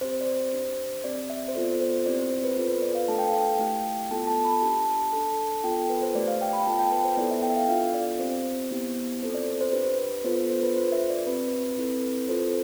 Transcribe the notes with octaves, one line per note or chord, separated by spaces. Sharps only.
C4 G4 C5
D5
C5
D4 G4
C4 G4 D5
E5
C5
B3 F4 A4 D5
C5
C4 E4 G4 D5
C5
C5
B4
B3 F4 A4 C5
B4
D5
F5
A3 D4 A4 A5
G5
F5
G5
A3 E4 G4
B3 F4 A4 A5
A5
B5
D4 G4 A5
D4 A4
B3 F4 A4 G5
B4
C5
A3 D4 G4 D5
F5
G5
B5
G5
B3 F4 A4 A5
G5
B4
C5
B3 E4 A4 D5
E5
G5
E5
F5
B3 D4 F4 A4 F5
D5
C4 G4 C5
B3 E4 G4
C4 F4 A4 C5
D5
D5
C5
D4 G4 B4
B4
B3 D4 F4 A4 C5
C5
C5
B4
D4 F4 A4 C5
E5
D5
C4 G4 B4
C4 E4 A4
C4 F4 A4 C5